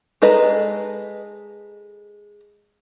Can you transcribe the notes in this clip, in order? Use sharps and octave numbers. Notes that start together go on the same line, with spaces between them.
G#3 A4 B4 D#5 A#5